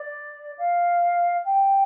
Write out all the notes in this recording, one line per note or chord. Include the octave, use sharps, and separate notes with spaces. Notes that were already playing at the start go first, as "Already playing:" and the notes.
Already playing: D5
F5
G5